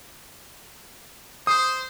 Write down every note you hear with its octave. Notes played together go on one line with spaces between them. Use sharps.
C5 D#6